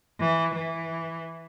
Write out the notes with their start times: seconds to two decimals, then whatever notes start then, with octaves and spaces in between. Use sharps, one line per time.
0.20 E3
0.56 E3